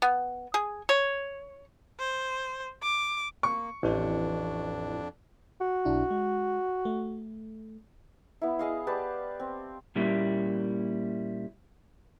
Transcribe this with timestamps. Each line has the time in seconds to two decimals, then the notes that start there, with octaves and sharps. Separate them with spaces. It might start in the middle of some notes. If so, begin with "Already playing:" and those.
0.02 B3
0.54 G#4
0.89 C#5
1.99 C5
2.83 D6
3.43 A#3 C#6
3.83 A1 F2 E3 C4 D4 E4
5.61 F#4
5.85 B1 D4 E4
6.11 G#3
6.85 A3
8.42 B3 E4
8.59 G#4 D#5 F5
8.87 G4 B4 D5 A5
9.40 C4
9.95 A#2 G3 A#3 C#4 E4